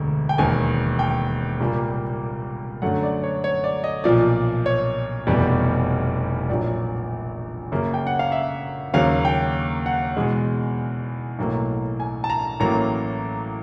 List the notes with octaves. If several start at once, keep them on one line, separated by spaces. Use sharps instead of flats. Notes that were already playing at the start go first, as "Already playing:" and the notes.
Already playing: E1 D2 D3
G5
E1 D#2 D#3 G#5
G5
C2 A#2 G3 A#3
F#2 D3 F#3 A3 F#5
D5
C#5
C#5
D5
D#5
B1 A#2 F3 D5
C#5
F1 E2 B2 G3
A#1 A#2 F#3 D5
F#2 C#3 F#3 A#3
G5
F#5
F5
E5
D#2 C#3 F#3 A#3 F5
G5
F#5
E2 B2 G#3
B1 A2 F#3 A#3
G#5
A5
A#5
A1 A2 F#3 A#3 A#5